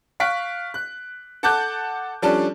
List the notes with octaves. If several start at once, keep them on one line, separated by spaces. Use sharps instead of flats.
F5 C#6 F#6 B6 D7
F#6
A4 F#5 A5 D6 F#6 G6
F3 G3 C#4 D4 A4